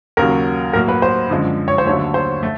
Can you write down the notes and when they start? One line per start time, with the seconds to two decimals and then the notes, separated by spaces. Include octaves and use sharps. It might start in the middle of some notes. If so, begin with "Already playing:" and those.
0.17 D#2 C#3 F#3 A#4
0.73 A2 F#3 A#3 A#4
0.88 B4
1.02 C5
1.30 F#2 D3 F3 G#3
1.68 C#5
1.78 C5
1.86 D#2 D3 F#3 A3 C#5
2.14 C5
2.43 A3